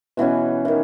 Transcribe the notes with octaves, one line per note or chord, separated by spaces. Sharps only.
B2 E3 B3 C#4
D#3 E3